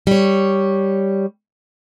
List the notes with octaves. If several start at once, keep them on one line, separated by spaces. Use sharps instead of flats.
G3 C#5